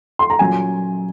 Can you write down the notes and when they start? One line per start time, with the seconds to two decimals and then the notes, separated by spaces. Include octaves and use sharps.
0.19 C6
0.30 A#5
0.39 A#2 F#3 C#4 G#5